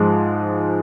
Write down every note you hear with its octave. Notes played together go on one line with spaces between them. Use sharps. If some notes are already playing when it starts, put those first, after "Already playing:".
Already playing: G#2 F3 G#3